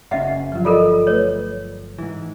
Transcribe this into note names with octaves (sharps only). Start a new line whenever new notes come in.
F#1 C#4 D#5 E5 F#5
G1 F3 F#3 F4
F4 A4 A#4 D5 D#5
A3 B4 C#5
G#2 E3